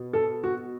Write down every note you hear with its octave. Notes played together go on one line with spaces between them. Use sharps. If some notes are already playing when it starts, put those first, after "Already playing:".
Already playing: B2
A4
F#4